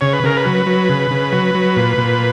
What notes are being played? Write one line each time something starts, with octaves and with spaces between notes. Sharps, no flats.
C#3 C#5
B4
C#3 A#4
B4
F#3
F#3
C#3
C#3
F#3
F#3
A#2
A#2